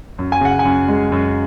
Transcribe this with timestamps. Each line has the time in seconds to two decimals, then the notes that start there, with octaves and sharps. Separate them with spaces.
0.19 F#2
0.32 G#5
0.41 C#3 F#5
0.59 G#5
0.65 F#2
0.88 G#3
1.12 F#2